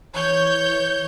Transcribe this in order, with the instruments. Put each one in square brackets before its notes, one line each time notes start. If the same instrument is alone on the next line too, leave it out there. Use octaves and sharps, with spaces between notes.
[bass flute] E3 [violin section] C#5 G6